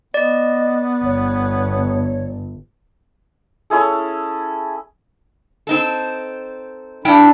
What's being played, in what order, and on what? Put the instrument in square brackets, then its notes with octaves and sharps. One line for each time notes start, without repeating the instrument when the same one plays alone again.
[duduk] B3 [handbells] D5 [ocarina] D#5
[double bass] G1 [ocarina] C#5
[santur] C#4 E4 G#4 A4
[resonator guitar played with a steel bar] C4 D#4 A4
[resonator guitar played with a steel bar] G2 E4 G5 [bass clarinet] D4